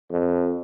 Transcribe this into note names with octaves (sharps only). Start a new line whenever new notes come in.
F2